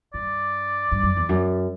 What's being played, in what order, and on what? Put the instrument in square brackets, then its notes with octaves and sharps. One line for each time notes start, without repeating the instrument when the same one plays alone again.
[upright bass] G2 [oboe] D5
[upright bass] G2
F#2
E2
F#2